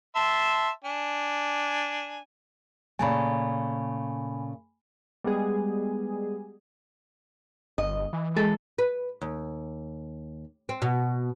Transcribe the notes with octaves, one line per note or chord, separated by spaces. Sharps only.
E5 A5 C6
D4 G#5
A#2 C#3 A3 G#5 B5
G3 G#3 B3 G#4
G1 D#5
E3
G#3 A4
B4
D#2
C4
B2